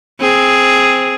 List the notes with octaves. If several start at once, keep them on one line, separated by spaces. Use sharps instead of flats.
C4 G#4